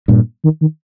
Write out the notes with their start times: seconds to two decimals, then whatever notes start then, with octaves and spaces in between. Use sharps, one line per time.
0.08 G2 A#2
0.44 D#3
0.61 D#3